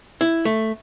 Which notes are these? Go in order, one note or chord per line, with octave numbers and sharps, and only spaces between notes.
E4
A3